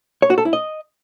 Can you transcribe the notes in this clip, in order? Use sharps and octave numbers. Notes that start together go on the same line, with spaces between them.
C#5
F#4
A4
E4
D#5